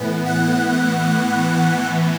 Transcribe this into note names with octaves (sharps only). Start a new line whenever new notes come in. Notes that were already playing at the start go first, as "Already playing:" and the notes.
Already playing: A2 E3 B3
F#5